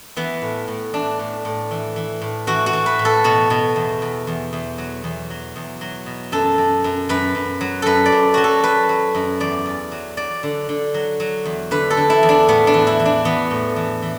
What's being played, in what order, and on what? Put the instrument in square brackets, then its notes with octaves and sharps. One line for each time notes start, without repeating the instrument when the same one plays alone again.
[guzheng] E3 B3
A2
A2
E3 D4
A2
A2
E3
E3
A2
E3 F#4
F#4
E3
B4
A2
A4
B2 F#4
B2
E2
E2
E2
E2
F#3
E2
F#3
E2
F#3
B2
F#2 A4
F#2
F#2
F#2 B4
F#2
F#3
F#2 A4 B4
D5
F#2
F#3 F#4
A4
F#3 B4
F#3
F#2
E2 D5
E2
F#3
F#3 D5
D3
D3
F#3
F#3
E2
D3 B4
A4
D3
E4
E2
D4
A2 B3
D4
E3
E4
E3
D4
E3 B3
A2
E3
E3